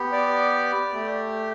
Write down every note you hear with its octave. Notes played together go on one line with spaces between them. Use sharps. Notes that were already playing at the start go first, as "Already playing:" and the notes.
Already playing: B3 G4
D5
A3 G4